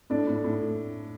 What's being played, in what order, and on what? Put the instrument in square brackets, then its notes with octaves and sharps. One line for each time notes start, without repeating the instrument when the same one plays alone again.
[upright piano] A2 D4
A2
A2